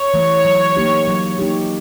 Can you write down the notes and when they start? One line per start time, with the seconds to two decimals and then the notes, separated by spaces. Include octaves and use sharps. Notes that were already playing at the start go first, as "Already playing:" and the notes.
Already playing: C#5
0.14 E3 A3
0.45 F#3
0.77 A#3 D#4 G4
1.08 F#3
1.39 A#3 D#4 G4